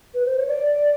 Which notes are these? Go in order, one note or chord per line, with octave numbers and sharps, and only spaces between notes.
B4
C5
C#5
D5